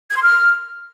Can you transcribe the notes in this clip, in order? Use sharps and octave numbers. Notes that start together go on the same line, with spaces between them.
G#6
C6
F6